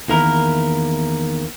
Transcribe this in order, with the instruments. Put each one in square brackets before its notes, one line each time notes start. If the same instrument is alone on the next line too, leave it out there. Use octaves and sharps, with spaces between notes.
[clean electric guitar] E2 D#3 A#3 E4 A#4